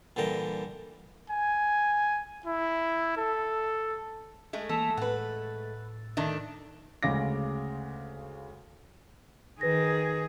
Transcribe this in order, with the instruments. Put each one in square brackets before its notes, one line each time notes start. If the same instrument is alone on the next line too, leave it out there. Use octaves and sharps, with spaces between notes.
[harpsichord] A#2 D3 E3 G3 G5 A#5
[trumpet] G#5
E4
A4
[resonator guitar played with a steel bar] G#3 A3
[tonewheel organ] E3 A#3 [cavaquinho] A4
[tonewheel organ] A2 [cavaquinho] B4 F#5
[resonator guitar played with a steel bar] D#3 A3 D4
[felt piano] D2 C#3 G#3 F5 D6 A#6
[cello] D#3 G#4 [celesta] B4 A#6